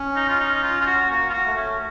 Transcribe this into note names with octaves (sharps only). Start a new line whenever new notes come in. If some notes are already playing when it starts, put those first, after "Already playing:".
Already playing: C#4
D#4
F4
D#4
F4
F4
F#4
A#3 F#4
F4
F#4
A3
C#4